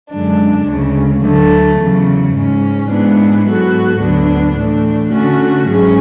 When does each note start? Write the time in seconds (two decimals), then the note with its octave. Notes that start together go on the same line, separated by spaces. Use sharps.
0.10 F#2 D3 G#3 D4
0.67 D2 C#3 G#3
1.22 D2 D3 F#3 A3
1.78 E2 C#3 F#3
2.33 G#2 G#3 C#4
2.89 G#2 E3 G#3 B3 D4
3.45 G#2 F#3 B3 F#4 A4
4.00 D2 D3 F#3 B3 D4
4.56 A2 E3 A3 D4
5.12 D3 A3 C#4 F#4
5.67 G#2 F#3 C#4 G#4